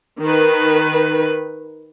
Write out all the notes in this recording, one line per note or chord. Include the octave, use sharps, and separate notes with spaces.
D#3 B4